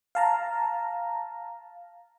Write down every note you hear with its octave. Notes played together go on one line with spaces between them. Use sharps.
F5 A5 A#5